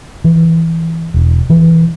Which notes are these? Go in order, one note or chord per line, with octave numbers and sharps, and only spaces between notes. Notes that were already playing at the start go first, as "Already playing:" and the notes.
E3
E1
E3